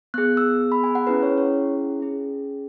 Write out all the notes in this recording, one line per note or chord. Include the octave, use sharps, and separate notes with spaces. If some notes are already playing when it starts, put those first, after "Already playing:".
B3 G#4 F#6
E6
B5
G#5
F#5
C#4 E4 G#4 B4
C#5
C#5
C#4 G#4